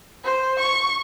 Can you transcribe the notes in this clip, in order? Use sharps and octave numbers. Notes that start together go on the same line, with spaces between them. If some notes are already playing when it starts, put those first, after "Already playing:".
C5
C#6